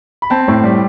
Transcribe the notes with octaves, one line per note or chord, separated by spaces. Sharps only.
B5
C4 A5
A2
G3